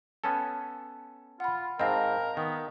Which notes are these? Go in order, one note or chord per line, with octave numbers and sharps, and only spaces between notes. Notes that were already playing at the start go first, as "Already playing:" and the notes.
B3 C#4 A4 A5
F4 F#5 B5
G#2 C4 A#4 D#5 F5 A5
D#3 B3